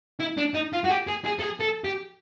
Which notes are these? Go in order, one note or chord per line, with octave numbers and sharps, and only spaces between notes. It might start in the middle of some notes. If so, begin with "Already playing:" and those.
E4
D4
D#4
F4
F#4
G4
G#4
G#4
A4
G#4
A4
G4